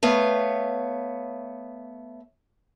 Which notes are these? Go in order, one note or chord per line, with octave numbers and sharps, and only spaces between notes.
A3 B3 C#5 F5